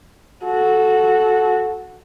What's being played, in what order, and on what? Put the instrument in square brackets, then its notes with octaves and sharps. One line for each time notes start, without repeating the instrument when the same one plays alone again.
[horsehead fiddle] F#4 A4